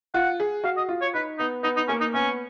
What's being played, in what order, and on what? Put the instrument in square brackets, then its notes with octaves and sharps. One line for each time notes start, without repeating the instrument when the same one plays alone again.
[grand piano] F4 [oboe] F#5
[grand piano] G#4
[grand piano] F#4 [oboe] F5
[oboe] D#5
[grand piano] F4
[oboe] C#5
[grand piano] D#4 [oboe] B4
[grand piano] B3 [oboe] D#4
[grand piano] B3 [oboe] D#4
[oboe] D#4
[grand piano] A#3 [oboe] C#4
[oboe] D#4
[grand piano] B3 [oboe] C#4